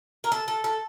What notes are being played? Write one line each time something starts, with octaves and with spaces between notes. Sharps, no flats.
A#4
A4
A4
A4